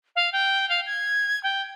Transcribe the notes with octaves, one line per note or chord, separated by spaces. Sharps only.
F5
G5
F5
G#6
G5